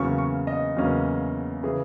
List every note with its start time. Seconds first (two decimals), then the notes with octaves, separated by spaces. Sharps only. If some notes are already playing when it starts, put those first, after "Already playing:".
Already playing: E2 C#3 F#3 A#3 C#4 C#6
0.18 C#6
0.47 D#5
0.76 E2 C#3 F#3 A#3 C#4
1.63 C#3 E3 G#4